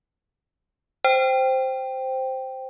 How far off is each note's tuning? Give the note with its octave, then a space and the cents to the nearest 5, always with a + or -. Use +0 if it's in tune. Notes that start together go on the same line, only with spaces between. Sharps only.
C5 +0 G5 +0